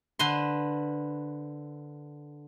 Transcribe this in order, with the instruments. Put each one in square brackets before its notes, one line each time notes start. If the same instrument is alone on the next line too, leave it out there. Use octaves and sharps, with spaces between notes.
[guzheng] D3 B4 C5 C6